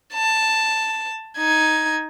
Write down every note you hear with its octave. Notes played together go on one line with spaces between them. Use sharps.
A5
D#4 G#6